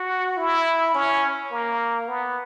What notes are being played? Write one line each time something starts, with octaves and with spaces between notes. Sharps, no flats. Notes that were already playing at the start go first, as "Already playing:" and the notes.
Already playing: F#4
E4
C#4
A#3
B3